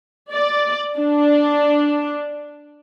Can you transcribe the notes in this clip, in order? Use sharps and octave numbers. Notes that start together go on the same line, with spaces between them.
D5
D4